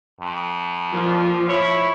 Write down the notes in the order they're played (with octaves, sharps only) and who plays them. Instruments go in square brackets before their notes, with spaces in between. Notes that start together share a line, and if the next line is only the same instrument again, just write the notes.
[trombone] F2
[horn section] A#2 F4 [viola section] F3
[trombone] E4 [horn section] C#5 B5